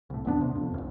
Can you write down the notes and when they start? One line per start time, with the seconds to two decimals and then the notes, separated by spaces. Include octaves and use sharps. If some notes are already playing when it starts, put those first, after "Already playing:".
0.10 C2 A2
0.25 G1 D#2 B3 D4
0.41 C3
0.55 F2
0.74 F1 C#2